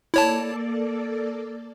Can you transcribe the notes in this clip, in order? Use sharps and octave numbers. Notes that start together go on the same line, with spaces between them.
A#3 E4 A4 C#5 D5 A5